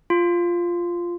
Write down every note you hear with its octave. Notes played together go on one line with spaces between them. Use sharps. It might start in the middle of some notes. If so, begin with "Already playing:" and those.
F4